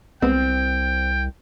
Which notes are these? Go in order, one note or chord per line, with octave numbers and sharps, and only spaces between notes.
C2 G#3 B3 C4 G5